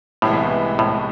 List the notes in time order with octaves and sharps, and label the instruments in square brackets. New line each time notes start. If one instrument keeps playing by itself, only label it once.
[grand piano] C2 C3 E3 G#3 B3 [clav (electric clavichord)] A2
[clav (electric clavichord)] A2